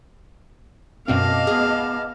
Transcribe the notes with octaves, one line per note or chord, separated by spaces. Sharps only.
F#2 B2 C4 D#5 F5 A5 D6
B3 G#4